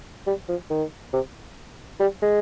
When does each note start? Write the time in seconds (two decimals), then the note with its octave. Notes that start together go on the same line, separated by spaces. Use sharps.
0.27 G3
0.49 F3
0.70 D#3
1.13 C3
2.00 G3
2.22 G#3